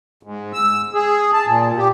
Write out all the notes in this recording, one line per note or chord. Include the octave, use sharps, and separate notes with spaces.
G#2
E6
G#4
A5
A#2
G4